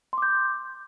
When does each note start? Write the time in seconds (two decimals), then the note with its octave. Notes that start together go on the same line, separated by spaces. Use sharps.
0.13 C6
0.18 D6
0.22 G6